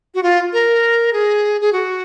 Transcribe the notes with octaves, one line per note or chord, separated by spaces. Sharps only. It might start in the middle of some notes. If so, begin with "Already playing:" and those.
F#4
F4
A#4
G#4
G#4
F#4